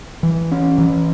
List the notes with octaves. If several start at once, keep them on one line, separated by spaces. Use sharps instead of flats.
E3
C#4
E3